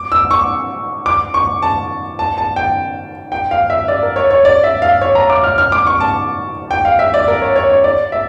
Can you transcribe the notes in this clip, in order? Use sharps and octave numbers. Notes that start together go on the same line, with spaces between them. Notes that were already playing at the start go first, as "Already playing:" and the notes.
Already playing: D6
E6
C#6
D6
C#6
A5
A5
A5
G5
G5
F5
E5
D5
A#4
C#5
C#5
D5
E5
F5
C#5
A#5
D6
F6
F6
D6
C#6
A5
G5
F5
E5
D5
A#4
C#5
C#5
C#5
D5
E5